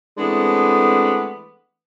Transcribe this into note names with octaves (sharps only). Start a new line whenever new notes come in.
E3 G#3 A3 B3 C4 D4